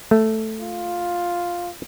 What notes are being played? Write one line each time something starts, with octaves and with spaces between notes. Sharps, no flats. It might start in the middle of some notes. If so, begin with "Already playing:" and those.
A3
F4